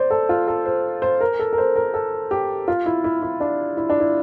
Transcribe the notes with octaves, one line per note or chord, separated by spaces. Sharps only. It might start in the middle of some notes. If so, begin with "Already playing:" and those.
Already playing: C5 D5
A4
F4
A4
C5
C5
A#4
A4
A#4
C5
A#4
A4
G4
F4
E4
E4
E4
D4
E4
D4
E4